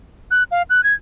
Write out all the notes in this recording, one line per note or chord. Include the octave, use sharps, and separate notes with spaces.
F#6
F5
F#6
G#6